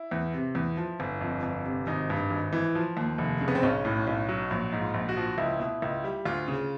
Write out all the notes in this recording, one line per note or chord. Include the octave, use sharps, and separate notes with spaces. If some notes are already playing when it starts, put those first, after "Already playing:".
Already playing: E4
E2
C3
E2
F3
G1
F2
G1
C3
G#1 D#4
G2
G#1
E3
F3
D#2
F1
C#3
B3
C4
B1 C#4
A2
B1
F#3
A#1
G#2
F4
A#1
F#4
F3
C#2 E4
B2
C#2
G3
D2 F4
C#3